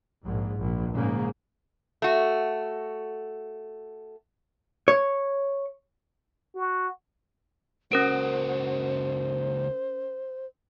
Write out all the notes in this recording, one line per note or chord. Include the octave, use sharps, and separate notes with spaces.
A#1 G#2
A#1
A#1 G#2 C#3 A#3
A3 F#4
C#5
F#4
C#2 C#4 F#4 A#4 C5 D7